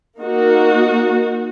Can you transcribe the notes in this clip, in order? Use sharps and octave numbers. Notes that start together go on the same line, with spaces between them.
A#3 D#4 F#4